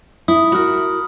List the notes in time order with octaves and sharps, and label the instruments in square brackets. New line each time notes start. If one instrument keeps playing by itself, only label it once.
[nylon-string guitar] E4 [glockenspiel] D#6
[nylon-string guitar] F#4 A#4 [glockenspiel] B5 F6